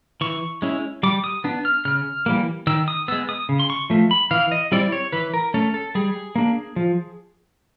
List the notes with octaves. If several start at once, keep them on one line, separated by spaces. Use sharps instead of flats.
E3 C#6
G#3 C#4 E4
G3 D6
D#6
B3 D4
F6
C#3 F6
E3 G3 A#3
D#3 E6
D#6
G#3 B3 E6
D#6
C#3
C6
C#6
F3 A3
B5
E3 F5
D#5
G3 C4 E4 D5
C#5
E3 B4
A#4
A3 C#4 A4
A4
G3 G#4
A#3 D4
F3